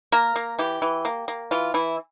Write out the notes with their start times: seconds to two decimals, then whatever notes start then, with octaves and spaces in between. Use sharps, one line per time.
0.12 A#3 A#4
0.36 A#3
0.59 E3 G4
0.82 E3
1.05 A#3
1.28 A#3
1.51 E3 F4
1.74 E3 E4